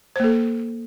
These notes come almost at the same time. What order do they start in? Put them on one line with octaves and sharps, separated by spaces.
C5 A#3 A4